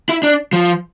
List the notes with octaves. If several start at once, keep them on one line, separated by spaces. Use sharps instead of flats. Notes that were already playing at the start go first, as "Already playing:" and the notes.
E4
D4
F3